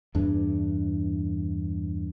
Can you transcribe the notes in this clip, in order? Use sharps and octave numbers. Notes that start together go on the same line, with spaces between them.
E2 G2 E3 D4